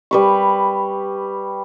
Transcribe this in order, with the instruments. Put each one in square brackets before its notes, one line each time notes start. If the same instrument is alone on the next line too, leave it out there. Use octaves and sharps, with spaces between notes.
[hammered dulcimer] G3 B4 C#6